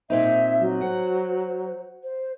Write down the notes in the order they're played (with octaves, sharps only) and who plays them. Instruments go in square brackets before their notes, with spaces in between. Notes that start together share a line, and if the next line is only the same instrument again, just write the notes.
[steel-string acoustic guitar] A#2 C4 D#4 [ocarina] E5
[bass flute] F#3
[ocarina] C5 [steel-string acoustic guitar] F#5
[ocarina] C5